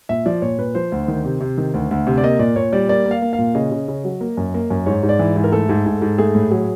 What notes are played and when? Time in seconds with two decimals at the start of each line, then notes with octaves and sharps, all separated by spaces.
0.09 A#2 E5
0.26 F3 D5
0.42 A#2 C#5
0.59 A#2 B4
0.75 F3 C5
0.92 D2
1.08 D#3
1.25 C3
1.41 C3
1.58 D#3
1.74 D2
1.91 D2
2.07 C3
2.18 D5
2.23 A#3 D#5
2.39 A#2 D5
2.56 A#2 C#5
2.73 G3 D5
2.89 A#3 D5
3.06 A#3
3.11 F5
3.22 A#3
3.33 F5
3.38 A#2
3.55 C#3 D#5
3.72 C#3
3.88 C#3
4.04 F#3
4.21 A#3
4.37 F#2
4.54 A#3
4.70 F#2
4.86 G#2 C#5
5.03 G#2
5.09 D5
5.19 E3
5.36 G#2
5.44 A#4
5.52 A3 A4
5.69 G#2
5.86 G#2
6.02 G#2
6.18 A3 G#4
6.35 A2
6.51 F#3 G#4